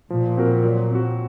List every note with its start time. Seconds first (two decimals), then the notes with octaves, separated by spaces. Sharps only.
0.10 A#2 F3
0.37 C4 F#4 A#4
0.64 F#3
0.91 C4 F#4